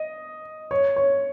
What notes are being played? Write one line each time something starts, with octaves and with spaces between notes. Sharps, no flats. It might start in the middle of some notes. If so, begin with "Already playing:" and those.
Already playing: D#5
C#5
C#5